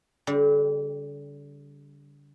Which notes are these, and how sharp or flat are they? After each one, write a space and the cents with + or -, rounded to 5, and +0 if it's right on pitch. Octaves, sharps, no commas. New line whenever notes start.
D3 -35 G3 +5